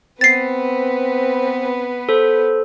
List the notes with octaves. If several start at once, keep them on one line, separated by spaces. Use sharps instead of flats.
B3 C4 B4 A6 C7
A4 C5